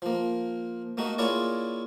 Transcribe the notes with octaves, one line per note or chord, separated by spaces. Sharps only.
F3 A#3
A3 A#3 D#4 F#4
A#3 E4 F4 G#4 C#5 D5